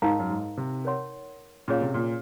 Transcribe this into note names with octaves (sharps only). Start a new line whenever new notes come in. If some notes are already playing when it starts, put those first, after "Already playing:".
G#2 D#4 A#4 F5 A#5
F#2
G#2
C3
A#4 C#5 F#5 C6
A#2 C#4 G#4 C#5 F5
C3
A#2